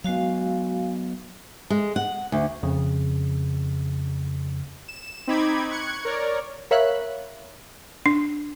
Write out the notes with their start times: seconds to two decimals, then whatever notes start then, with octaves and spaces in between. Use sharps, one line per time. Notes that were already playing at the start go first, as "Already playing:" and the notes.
0.04 F#3 G#3 B3 F#4 F5
1.70 G#3
1.96 F#5
2.32 D2
2.63 F2 C#3
4.88 E7
5.27 C4 D#4 B5 D6 G#6
5.71 C#6 F#6 G#6 C#7
6.05 A#4 C#5 D5
6.71 A#4 C#5 E5 F5 B5 F#6
8.06 D4